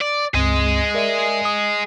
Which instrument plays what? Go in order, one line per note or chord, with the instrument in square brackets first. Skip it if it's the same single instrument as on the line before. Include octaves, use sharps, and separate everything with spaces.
[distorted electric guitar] D5
[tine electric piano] C#2 G2 C4 [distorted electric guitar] G#4 D#5
[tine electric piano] A#4 D5 E5
D#6